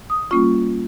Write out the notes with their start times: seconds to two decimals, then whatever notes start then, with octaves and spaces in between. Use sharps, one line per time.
0.10 D#6
0.31 G3 A#3 C#4 F4 C#6